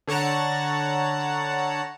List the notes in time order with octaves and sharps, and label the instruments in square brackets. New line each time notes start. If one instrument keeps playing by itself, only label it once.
[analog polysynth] D3 C#5 F#5 A5 A#5